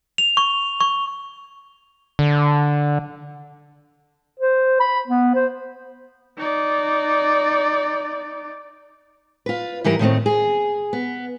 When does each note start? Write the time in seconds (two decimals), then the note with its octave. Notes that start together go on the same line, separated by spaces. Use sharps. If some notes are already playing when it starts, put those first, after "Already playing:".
0.18 F7
0.37 C#6
0.81 C#6
2.19 D3
4.40 C5
4.80 B5
5.08 B3
5.35 C5
6.38 D#4 D5
9.46 F4 B4
9.84 G#2 E3 G3 A#4
9.99 A2 D#3 A3 C4
10.26 G#4
10.93 B3